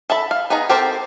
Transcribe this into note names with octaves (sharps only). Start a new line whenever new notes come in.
A4 E5 A5 B5
F5
B3 D#4 G#4 A#5
C4 G4 A4 A#4 C5